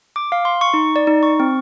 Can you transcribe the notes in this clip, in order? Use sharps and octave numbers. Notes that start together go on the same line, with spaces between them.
D6
F5
C6
C#6
D#4
D5
D#4
C#6
C4